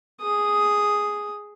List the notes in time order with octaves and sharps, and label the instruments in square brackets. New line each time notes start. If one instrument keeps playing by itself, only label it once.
[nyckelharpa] G#4 D#6